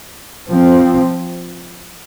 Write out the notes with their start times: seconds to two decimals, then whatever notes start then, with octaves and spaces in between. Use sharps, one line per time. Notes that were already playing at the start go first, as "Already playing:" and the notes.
0.49 F3 C4